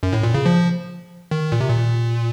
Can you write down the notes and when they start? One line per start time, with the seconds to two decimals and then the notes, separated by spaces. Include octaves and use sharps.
0.03 F#2
0.13 A2
0.23 A#2
0.35 C#3
0.46 F3
1.31 D#3
1.52 A#2
1.60 C3
1.69 A#2